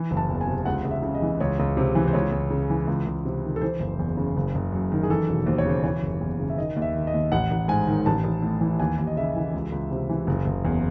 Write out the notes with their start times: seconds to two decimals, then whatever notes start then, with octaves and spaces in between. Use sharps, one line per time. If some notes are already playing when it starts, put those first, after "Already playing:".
Already playing: E3
0.11 F#1
0.17 A5
0.30 E2
0.41 G#5
0.47 C3
0.65 C#2 F#5
0.85 C#2
0.91 E5
1.03 C#3
1.15 D#5
1.22 E3
1.40 C#2 C#5
1.59 C#2
1.77 C3
1.95 E3
2.08 C5
2.13 C#2 C#5
2.32 C#2
2.50 C#3
2.70 E3
2.87 C#2
3.06 C#2
3.25 C3
3.44 D#3
3.56 A4
3.61 E3 C5
3.80 F#1
3.99 E2
4.17 C#3
4.37 F#1
4.55 F#1
4.72 F#2
4.92 D#3
5.03 G#4
5.10 E3 A4
5.29 E1
5.46 D#2 C5
5.58 C#5
5.65 C#3 C5
5.84 E3 C#5
6.03 F#1
6.21 E2
6.40 C#3
6.50 E5
6.58 D#3 D#5
6.76 D#2
6.82 E5
6.95 D#3
7.07 D#5
7.13 D#2
7.32 A1 F#5
7.51 A1
7.68 G#2 G#5
7.87 D#3
8.06 A1 A5
8.24 A1
8.42 A2
8.61 E3
8.80 D#2 G#5
8.98 D#2
9.07 D#5
9.17 C#3 E5
9.36 E3
9.54 C#2
9.72 C#2
9.91 C3
10.09 E3
10.27 F#1
10.46 F#1
10.65 E2